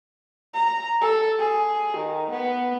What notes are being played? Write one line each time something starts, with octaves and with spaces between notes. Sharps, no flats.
A#5
A4
G#4
D#3
B3